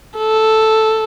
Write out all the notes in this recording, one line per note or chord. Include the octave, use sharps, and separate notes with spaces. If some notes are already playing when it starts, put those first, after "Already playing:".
A4